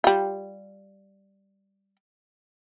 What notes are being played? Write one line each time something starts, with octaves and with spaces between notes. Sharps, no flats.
G3 F4